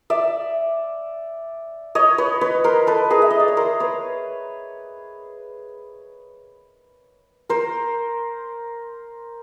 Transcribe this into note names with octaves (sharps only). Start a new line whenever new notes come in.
D5 E5
C#5 D#5
B4 C#5
B4 C#5
A#4 C5
A4 B4
G#4 A#4
E5
D#5
D5
C#5
A#4 C5
B4 C#5
A#4 C5